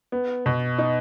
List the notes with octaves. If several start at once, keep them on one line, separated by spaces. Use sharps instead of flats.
B3
B2
D#4